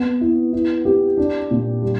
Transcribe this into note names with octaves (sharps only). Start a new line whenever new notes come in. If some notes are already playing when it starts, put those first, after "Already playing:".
Already playing: B3
E4
E4
G4
D4
A#2
G3